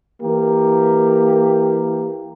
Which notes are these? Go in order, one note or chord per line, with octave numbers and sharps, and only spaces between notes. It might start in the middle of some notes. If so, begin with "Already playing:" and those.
E3 A#3 G4 A#4